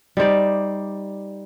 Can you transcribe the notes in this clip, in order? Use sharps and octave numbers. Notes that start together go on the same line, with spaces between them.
G3 D#4 C5 D5